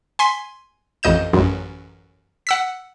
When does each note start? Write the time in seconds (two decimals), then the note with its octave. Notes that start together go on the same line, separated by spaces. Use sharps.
0.19 G#5 C6 B6
1.03 A1 F2 D#5 G6 E7
1.33 A1 F#2
2.47 F#5 E6 B6